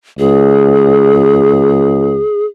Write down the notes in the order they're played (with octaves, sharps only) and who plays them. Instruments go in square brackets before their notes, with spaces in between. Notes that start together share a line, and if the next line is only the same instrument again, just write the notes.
[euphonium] C#2 [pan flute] G#4